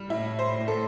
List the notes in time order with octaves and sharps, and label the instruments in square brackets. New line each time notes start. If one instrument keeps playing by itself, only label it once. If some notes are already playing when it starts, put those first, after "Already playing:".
Already playing: [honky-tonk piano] G3
[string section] A2 [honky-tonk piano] E4
[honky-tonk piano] C5
A4